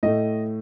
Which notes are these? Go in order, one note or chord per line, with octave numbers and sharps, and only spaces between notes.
A2 A3 D#5